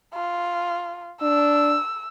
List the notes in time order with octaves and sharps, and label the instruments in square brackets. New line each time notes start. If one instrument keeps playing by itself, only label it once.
[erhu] F4
[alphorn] D4 [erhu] E6